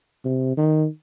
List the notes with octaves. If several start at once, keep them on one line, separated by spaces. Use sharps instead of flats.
C3
D#3